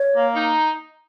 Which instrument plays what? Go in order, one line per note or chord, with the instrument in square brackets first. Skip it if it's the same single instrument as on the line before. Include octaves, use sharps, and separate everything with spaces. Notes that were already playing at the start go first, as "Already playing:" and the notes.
Already playing: [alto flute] C#5
[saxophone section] A#3
D#4